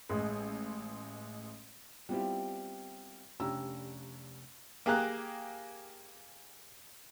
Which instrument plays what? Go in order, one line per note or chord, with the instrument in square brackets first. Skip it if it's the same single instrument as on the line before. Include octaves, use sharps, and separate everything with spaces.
[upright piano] A1 G#3
[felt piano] G3 B3 C4 E4 F4 G4
F1 C#4 D4 G4 A#5 E6
[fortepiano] A#3 G4 G#4 A#5 F#6